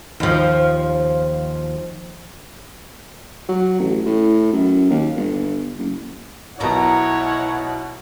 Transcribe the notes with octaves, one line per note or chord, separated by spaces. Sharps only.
D#2 F3
F#3
A1
A2
F#2
D#2
G1
F#1
B1 B2 E4 F#4 A#4 C#5 F#5 A#5